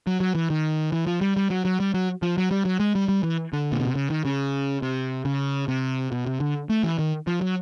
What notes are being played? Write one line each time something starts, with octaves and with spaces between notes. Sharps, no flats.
F#3
F#3
E3
D#3
E3
F3
G3
G3
F#3
F#3
G3
F#3
F3
F#3
G3
F#3
G#3
G3
G3
E3
D3
A#2
B2
C3
C#3
D#3
C#3
C3
C#3
C3
B2
C3
D3
A3
E3
D#3
F3
F#3